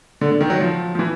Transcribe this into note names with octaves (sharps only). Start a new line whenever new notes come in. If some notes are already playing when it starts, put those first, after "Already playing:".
D3
D3
D#3
F#3
F3
F3
E3